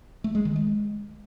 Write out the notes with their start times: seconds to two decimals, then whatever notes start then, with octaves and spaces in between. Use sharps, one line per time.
0.24 A3
0.35 G#3
0.45 D#3
0.56 G#3